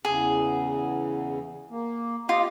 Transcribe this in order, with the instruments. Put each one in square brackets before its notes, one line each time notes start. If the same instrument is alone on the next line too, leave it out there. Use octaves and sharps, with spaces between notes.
[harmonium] E2 C#3 [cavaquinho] G#4
[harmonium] A#3
[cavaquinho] F4 [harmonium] G4 D#5